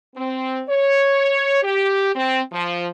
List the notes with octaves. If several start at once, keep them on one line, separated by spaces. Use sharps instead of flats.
C4
C#5
G4
C4
F3